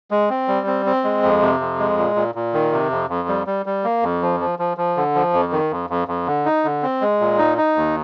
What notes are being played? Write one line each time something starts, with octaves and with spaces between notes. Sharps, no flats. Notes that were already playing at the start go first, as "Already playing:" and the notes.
G#3
C4
G3
C4
C4
G#3
F2
C3
F2
G#3
A#2
A#2
A#2
D#3
C3
F2
F2
G3
G3
G3
A#3
F2
F3
F3
F3
F3
D3
F3
F2
D#3
F2
F2
F2
D3
D#4
D3
C4
G#3
A#2
D#4
D#4
D#2